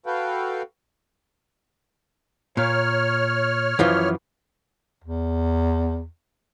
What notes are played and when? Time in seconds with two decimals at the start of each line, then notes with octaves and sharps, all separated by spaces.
0.06 F#4 A4 B4 F5 G5
2.57 A#2 C#5 F6
3.79 F#2 E3 F3
5.04 E2